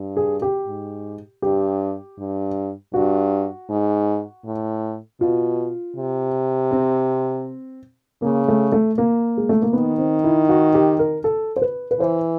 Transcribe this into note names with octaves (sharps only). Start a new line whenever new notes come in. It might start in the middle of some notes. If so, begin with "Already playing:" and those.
Already playing: G2
G#4
G4
G#2
G2 G4
G2
G2 F#4
G#2
A2
B2 F4
C3
C4
C#3 A#3
A3
A3
A#3
G#3
A3
A#3
D#3 B3
C4
E4
F#4
G4
A#4
A4
C5
B4
B4
E3 C5